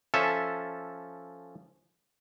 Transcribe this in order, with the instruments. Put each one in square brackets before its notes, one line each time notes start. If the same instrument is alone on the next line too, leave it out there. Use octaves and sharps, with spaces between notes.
[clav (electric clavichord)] F3 C#4 A4 E5